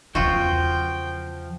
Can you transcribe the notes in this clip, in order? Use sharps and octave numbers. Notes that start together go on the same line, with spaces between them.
E2 C#3 F3 F4 F#4 G5